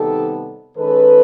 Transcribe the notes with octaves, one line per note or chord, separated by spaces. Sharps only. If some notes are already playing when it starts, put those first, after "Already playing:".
Already playing: C3 D#3 G3 B3 D#4 G4 A4
D#3 G#3 C#4 A4 B4